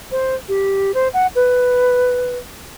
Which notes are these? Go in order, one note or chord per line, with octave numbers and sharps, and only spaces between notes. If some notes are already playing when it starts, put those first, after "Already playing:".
C5
G4
C5
F#5
B4